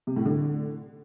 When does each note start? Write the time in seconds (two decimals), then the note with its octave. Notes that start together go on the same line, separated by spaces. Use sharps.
0.07 C3
0.16 A2
0.26 D3